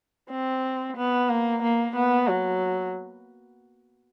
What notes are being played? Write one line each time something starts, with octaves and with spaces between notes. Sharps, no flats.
C4
B3
A#3
A#3
B3
F#3